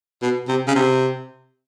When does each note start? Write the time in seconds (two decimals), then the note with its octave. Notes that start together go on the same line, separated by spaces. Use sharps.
0.22 B2
0.48 C3
0.68 C#3
0.75 C3